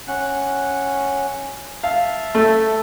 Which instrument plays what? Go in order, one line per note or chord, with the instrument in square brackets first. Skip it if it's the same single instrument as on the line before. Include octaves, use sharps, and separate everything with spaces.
[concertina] C#4 F#5 F#6
[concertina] E5 A5 [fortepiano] F5
[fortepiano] A3